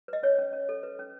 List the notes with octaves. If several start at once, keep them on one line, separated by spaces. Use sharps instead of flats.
B4 D#5
C#4 C#5
C#4
C#4
A4
B4
C#4